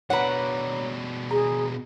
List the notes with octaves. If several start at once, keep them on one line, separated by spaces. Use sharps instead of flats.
B2 D4 B4 C#5 F#5 A#5
G#4 A#5